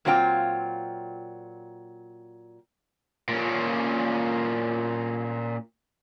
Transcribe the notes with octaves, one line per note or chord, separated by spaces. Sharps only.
A#2 F#3 C4 F4 A#4 G5
A#2 C#4